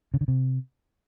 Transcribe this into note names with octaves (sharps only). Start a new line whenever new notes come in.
C#3
D3
C3